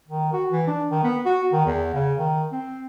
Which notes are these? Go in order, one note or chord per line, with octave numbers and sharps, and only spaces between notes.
D#3
F#4
E3
D4
D#3
B3
F#4
D#3
E2
C#3
D#3
C4